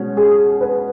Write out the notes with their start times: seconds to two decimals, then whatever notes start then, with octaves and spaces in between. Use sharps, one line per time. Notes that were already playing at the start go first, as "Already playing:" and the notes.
Already playing: B2 G#3 C#4
0.17 G#4
0.61 B4